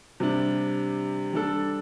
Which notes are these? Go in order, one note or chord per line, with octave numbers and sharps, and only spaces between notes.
C3 G3 D4
G3 D4 A4